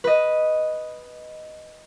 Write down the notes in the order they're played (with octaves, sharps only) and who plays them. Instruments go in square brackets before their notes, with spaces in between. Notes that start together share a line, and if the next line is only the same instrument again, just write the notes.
[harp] B4 D#5